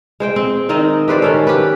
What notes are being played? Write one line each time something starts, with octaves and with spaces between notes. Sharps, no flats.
G#3 C5 G5
C4
D#3 C4 D#4 D#5
G4 B4 C5 D5
D#3 C#4 A4
G4 B4